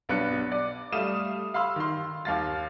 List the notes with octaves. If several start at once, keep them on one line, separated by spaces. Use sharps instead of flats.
B1 B3 D4 F#6 C#7
D5
G3 A3 F5 D#6 E7
F5 B5 C6 E6
D#3 C6
D#2 F5 A6